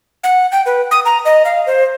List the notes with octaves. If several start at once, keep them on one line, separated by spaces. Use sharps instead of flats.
F#5
G5
B4
D#6
A#5
D#5
F5
C5